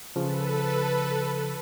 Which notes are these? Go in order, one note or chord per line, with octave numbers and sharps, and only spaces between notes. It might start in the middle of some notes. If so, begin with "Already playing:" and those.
C#3 F3 A4 B4